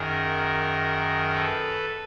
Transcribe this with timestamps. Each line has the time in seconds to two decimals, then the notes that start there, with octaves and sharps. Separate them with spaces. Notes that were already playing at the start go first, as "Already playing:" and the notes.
Already playing: F#2 D#3 G#4 A#4
1.33 A4 B4